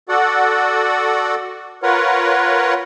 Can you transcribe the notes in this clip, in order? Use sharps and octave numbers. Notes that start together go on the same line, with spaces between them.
F#4 A4 D5 F#5
F4 A#4 B4 C#5 F#5